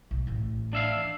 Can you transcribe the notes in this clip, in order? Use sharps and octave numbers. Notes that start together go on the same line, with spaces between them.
B1
A1 E3
D4 E5 F5